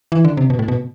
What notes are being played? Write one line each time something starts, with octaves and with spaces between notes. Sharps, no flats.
E3
D3
C3
B2
A2
B2